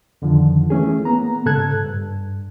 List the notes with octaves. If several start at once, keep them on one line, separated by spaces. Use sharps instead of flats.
F2 D3 D#3 F3
E3 A3 C#4 G#4
A#3 B3 A#5
G#2 C#3 A4 A5 F#6 G#6
G2